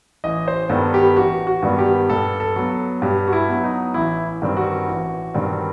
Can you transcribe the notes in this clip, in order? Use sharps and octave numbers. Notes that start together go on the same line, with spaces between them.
A1 D#5
C5
G2 D#3 G3 B3 A4
G4
A1 F#4
F#4
G2 D#3 G3 B3
G4
G2 A4
A4
F#3 B3
G2 G4
F#4
E4
F#3 B3
D#4
A1 E4
G2 D#3 G3 C4
F#4
A1
G2 D#3 G3 C4